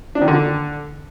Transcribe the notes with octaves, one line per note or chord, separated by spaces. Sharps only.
D4
D#3
D3